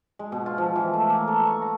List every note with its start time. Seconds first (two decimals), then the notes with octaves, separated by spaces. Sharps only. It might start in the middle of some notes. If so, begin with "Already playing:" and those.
0.19 G#3
0.32 B2
0.46 F4
0.58 F3
0.76 E3
0.94 A3
1.10 A#3
1.27 A4
1.46 C#6
1.62 A#5